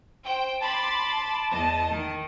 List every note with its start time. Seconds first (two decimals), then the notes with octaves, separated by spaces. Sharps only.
0.24 C5 G5
0.62 A5 B5 C6 D6 A6
1.50 E2 D#5
1.90 D#3